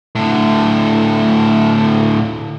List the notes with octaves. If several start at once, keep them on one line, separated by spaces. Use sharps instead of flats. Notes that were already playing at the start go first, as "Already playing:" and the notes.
A2 D3